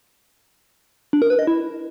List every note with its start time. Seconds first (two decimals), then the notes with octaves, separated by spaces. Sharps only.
1.13 D4
1.22 A#4
1.30 B4
1.39 D#5
1.47 E4